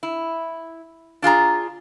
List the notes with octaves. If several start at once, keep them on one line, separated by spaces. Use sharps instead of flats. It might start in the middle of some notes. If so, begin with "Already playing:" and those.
E4
D4 F4 G#4 A#5